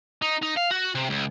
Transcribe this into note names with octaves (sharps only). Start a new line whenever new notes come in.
D#4
D#4
F5
F#4
C3
C#2